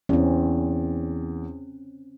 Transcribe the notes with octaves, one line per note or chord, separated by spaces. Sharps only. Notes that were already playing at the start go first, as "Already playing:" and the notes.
E2 C4 C#4